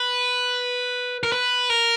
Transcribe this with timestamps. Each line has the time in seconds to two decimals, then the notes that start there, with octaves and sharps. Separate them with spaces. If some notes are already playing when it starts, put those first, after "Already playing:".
Already playing: B4
1.23 A#4
1.32 B4
1.70 A#4